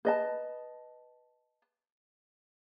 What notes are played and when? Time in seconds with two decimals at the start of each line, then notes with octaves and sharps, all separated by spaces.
0.05 B4 D#5 A5